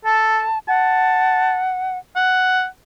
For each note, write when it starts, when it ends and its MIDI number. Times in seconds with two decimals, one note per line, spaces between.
0.05 0.44 69
0.05 0.59 81
0.68 1.98 78
0.68 1.60 81
2.16 2.65 78